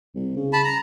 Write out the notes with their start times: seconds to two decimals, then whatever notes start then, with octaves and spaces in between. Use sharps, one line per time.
0.15 C2
0.36 C#3
0.53 A5 B5
0.65 A#5